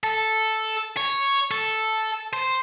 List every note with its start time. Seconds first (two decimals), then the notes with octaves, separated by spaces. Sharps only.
0.04 A4
0.97 C#5
1.51 A4
2.33 C5